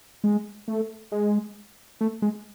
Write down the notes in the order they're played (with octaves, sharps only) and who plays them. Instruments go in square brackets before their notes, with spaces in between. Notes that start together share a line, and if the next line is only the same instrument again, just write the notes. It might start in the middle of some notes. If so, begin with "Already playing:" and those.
[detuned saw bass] G#3
A3
G#3
A3
G#3